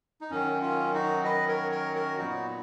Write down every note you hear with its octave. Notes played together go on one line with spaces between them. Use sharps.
D#4
F#2 D#3 F#3 C#4
C#4 F4
D#4 F#4
B4 D#5
A#4 C#5
A#4 C#5
F#4 A#4
A#2 F#3 B3 D#4 F#4